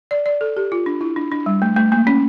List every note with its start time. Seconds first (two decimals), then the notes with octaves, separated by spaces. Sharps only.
0.11 D5
0.26 D5
0.41 A4
0.57 G4
0.72 F4
0.86 D4
1.01 E4
1.16 D4
1.32 D4
1.46 G3
1.62 A3
1.76 A3
1.92 A#3
2.07 C#4